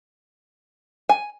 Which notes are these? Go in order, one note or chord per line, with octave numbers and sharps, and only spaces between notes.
G#5